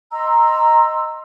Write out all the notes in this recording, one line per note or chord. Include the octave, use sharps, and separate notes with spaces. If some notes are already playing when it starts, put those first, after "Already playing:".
D#5 A#5 C6 E6